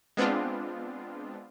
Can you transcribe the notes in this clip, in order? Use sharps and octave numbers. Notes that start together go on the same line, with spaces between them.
G#3 B3 C4 D4 F4